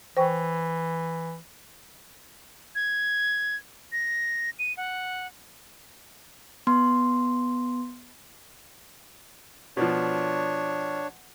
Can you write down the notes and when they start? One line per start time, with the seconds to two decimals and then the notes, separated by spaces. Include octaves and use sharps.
0.17 E3 C5 G5 C#6
2.75 G#6
3.92 A#6
4.59 D#7
4.77 F#5
6.67 B3 C6
9.77 B2 F3 D4 C#5